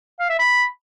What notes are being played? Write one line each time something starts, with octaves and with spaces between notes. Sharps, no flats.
F5
E5
B5